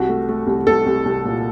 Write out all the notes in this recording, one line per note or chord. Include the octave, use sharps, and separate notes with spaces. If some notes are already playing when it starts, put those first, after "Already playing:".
Already playing: C2 F#4
A3
A3
C2
C2 A4
C2
C2
A#2